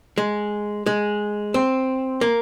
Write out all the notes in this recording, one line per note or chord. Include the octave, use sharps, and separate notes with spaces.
G#3
G#3
C4
A#3